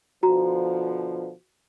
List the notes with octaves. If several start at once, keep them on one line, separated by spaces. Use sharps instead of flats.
B2 D3 F3 F#4 A#5